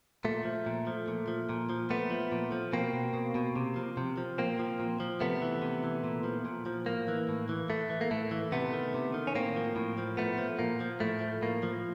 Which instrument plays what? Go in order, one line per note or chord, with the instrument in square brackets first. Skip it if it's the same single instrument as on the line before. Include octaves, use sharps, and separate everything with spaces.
[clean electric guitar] A#2 A3
F3
A#2
F3
A#2
F3
A#2
F3
A#2 A3 B3
F3
A#2
F3
B2 A#3 C4
B2
B2
B2
C3
F3
C3
F3
A#2 A#3 C4
F3
A#2
F3
C3 A3 B3
E3
C3
E3
A#2
F3
A#2
F3
A2 A#3
E3
A2
E3
A2 A3
E3
A#3
A2 A3
E3
C3 A3 B3
D#3
C3
D#3
C#4
A2 A#3 C4
F3
A2
F3
A#2 A3 B3
F3
A#2 A#3
F3
A2 A3
F3
A2 A#3
F3